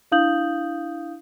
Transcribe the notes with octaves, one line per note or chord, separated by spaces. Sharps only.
D4 E4 F5 D#6 G6 F#7